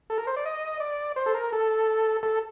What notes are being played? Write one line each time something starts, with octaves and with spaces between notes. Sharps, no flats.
A4
A#4
C5
D5
D#5
D5
C5
A4
A#4
A4
A4